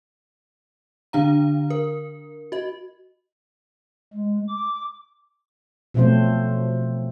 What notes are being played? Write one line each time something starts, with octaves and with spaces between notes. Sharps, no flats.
D3 D4 F5 A#5
A#4
F#4 D#5
G#3
D6
B2 F3 F#3 A3 C4 C5